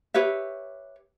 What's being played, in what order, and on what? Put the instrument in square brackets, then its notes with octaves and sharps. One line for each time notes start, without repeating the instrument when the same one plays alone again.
[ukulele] G4 B4 C#5 E5